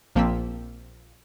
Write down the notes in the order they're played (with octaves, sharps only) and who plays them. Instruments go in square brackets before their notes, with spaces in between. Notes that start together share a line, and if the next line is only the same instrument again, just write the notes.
[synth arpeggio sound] A#1 F3 A#3 C4 E6 B6